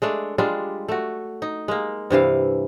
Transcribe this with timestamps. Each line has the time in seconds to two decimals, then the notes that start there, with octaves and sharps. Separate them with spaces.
0.02 G#3 A3 D4
0.38 G3 G#3 D4 F4
0.88 A3 F#4
1.42 D#4
1.68 G#3 A#3
2.10 G2 C3 E3 F5